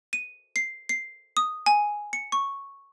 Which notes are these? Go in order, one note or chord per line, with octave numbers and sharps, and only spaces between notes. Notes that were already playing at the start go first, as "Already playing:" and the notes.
D#7
C7
C7
D#6
G#5
C#7
C#6